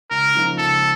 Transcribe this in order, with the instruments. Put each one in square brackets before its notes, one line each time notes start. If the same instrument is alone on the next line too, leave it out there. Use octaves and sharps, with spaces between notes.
[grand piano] C#2 [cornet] A#4
[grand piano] C#3 F3 A#3 D#4
[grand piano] C#2 [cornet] A4